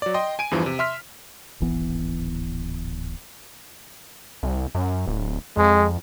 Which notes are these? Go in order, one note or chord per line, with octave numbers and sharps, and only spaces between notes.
F#3 D5
D#5 G5 C6
G#5 D7 D#7
E2 G2 E3 F3
C3
E5 C6 F6 B6
D1 G#1 E3 B3
C2
F#2
D1
F2 G#3